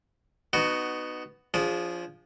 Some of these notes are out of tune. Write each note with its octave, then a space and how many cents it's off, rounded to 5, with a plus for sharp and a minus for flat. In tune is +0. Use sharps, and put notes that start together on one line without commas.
B3 +10 D#4 -25 F#4 +5
F3 +0 D4 -35 G#4 -15